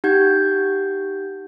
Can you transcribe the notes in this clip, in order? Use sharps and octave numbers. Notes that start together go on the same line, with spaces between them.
D#4 G4 F#5 G6 G#6